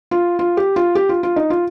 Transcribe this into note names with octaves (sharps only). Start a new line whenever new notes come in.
F4
F4
G4
F4
G4
F4
F4
D#4
F4